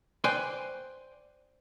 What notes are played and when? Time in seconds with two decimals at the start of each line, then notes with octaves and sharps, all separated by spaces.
0.24 B4 C5 D5 G5 G#5 C6